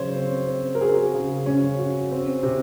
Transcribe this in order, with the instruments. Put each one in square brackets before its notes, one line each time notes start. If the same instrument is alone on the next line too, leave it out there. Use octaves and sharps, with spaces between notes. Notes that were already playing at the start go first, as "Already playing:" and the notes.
Already playing: [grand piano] C#3 F#3 [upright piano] C5 C#5
[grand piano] C4
C4
[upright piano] A#4
[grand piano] F#4 [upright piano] G#4
[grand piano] C#3
[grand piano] C#3 [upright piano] C#4
[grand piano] F#4
C4
C3